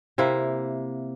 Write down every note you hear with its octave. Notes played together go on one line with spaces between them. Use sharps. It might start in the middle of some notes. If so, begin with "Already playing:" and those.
C3 A#3 E4